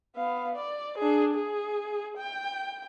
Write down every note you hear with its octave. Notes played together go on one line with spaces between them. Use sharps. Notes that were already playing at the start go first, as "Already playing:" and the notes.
B3 F5
D5
D4 G#4
G#4
G5